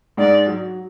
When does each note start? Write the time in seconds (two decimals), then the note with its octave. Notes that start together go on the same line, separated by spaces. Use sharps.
0.17 G#2 G#3 D5
0.46 F#3